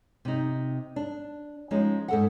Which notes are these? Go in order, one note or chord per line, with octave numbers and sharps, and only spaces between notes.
C3 D#4
D4
F3 G#3 C#4 D#4
G#2 A4 F#5